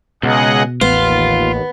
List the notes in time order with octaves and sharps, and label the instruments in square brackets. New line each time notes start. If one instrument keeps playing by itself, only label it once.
[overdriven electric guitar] C#2 [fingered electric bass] B2 [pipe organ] G#4 D#5 F#5
[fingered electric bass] A1 [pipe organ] D#2 [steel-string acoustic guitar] B3 [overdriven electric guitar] F4